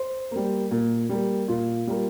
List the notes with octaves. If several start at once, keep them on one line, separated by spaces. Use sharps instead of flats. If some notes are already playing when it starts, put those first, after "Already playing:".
Already playing: C5
G3 A#3
A#2
G3 A#3
A#2 F4
G3 A#3